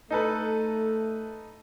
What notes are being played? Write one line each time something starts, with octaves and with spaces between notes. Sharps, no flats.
A3 D#4 A4 B4